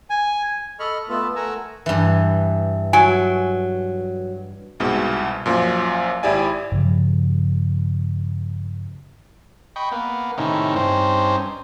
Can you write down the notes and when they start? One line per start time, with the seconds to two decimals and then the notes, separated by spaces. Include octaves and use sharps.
0.10 G#5
0.80 A4 D#5 B5 C#6 F6
1.09 A3 B3 F4 A4
1.36 A3 A#4 F#5 G#5 A#5 E6
1.86 G2 E3
2.93 F#3 G#5
4.80 C2 G#2 B2
5.46 F#2 A#2 F3
6.23 G#1 E4 G4 D5 G#5
6.72 G2 C#3 F3
9.76 D#5 G5 B5 C#6
9.92 A#3 B3
10.38 A2 C3 D#3 C#4 D#4 E4
10.76 G2 C4 C#4 D#4 C5